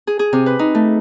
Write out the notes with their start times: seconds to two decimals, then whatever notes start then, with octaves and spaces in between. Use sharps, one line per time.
0.07 G#4
0.19 G#4
0.33 C3
0.46 B4
0.59 D#4
0.75 A3